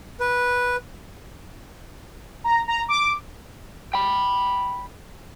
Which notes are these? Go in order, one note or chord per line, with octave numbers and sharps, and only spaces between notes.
B4
A#5
A#5
D6
G5 B5